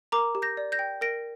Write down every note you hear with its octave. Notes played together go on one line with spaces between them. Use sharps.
A#4 A#5 D6
G4
G6 A#6
D5
G6 A#6
G5
A#4 A#6 D7